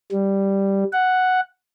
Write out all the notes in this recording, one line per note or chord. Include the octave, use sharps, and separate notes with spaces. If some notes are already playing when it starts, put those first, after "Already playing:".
G3
F#5